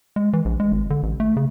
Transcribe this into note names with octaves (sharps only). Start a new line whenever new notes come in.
G#3
E3
A#1
G#3
G#1
D3
A1
A3
C#3